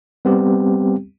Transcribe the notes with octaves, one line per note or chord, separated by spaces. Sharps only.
G3 B3 C4 G4